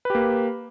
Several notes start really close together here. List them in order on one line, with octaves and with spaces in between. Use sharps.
B4 G4 A#3